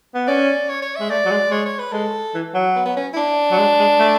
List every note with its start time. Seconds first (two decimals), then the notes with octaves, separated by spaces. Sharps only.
0.15 B3
0.27 C#4 D5
0.69 C#5
0.82 C#5
0.96 G#3 E5
1.10 A3 D5
1.25 F#3
1.31 G#3
1.51 G#3 C#5
1.66 C#5
1.79 B4
1.93 G#3 A4
2.35 E3
2.54 F#3
2.75 B3
2.86 B3
2.97 C#4
3.14 E4
3.17 D4
3.51 F#3
3.58 G#3
3.79 G#3
4.00 A3